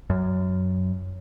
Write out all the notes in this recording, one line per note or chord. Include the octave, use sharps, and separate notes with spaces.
F#2